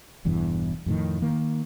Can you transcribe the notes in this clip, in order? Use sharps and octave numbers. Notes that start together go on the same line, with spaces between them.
E1 E2 G2 E3
F2 A2 D#3
D#3 A#3